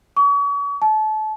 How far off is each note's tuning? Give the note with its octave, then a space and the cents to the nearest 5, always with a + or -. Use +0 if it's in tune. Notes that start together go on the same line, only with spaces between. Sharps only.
C#6 +40
A5 -30